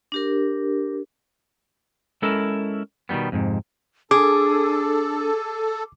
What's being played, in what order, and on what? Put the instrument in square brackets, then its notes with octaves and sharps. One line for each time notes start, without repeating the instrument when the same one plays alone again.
[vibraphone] D4 G4 A#4
[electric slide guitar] G#3 C#4 E4 A4 A#4
B2 D#3 E3 G3 B3
F2 G#2 C3
[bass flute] D4 [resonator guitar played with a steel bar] G#4 [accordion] A4 [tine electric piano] D6